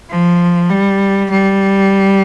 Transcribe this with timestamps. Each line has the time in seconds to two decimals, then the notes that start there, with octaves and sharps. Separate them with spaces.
0.10 F3
0.70 G3
1.31 G3